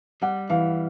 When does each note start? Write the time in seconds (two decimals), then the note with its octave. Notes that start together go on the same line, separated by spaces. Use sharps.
0.22 G3 F#5
0.50 E3 F5